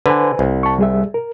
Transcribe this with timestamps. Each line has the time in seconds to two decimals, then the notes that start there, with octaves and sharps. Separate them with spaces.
0.06 D3 B4 C5 G#5
0.39 C2
0.63 A5 C#6
0.79 G3 G#4 E5
1.14 A#4